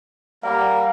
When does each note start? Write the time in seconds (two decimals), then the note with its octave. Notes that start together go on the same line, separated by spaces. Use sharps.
0.43 G3 A#3 A#4 F5 F#5 A#5